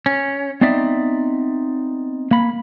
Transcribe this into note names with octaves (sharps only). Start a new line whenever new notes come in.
C#4
B3 C4 D#4 D5 E5
A#3 B5